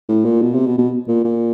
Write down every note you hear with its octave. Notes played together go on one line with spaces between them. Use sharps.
A2
A#2
B2
C3
B2
B2
A#2
A#2